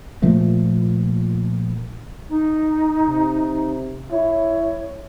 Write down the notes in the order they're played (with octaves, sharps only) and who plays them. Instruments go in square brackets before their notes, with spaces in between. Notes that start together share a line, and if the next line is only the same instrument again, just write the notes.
[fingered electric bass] A#2 F3 A3 A#3
[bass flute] D#4
[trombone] C3
[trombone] E4 [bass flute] C#5